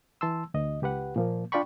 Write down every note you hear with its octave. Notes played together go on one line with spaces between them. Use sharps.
E3 A5 C6 E6
D2 D#5
C#2 G4 B4 F#5
A#2 F3 A#3
D4 F4 D5 G5 B5 C#6